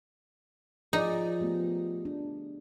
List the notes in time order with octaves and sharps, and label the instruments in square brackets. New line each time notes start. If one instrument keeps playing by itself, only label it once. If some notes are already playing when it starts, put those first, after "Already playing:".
[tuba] F3 [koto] D#4 [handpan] G#4 D5 D#5
[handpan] A3 B3 G4
D4